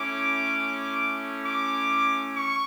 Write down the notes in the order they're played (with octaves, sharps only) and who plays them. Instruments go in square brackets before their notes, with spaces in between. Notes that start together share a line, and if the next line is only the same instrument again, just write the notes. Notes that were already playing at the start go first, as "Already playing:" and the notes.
Already playing: [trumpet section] A3 C#4 E4 D6
D6
C#6